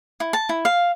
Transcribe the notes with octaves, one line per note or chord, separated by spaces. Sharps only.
E4
A5
E4
F5